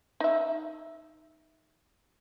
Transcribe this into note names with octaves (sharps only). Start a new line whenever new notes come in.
D#4 E5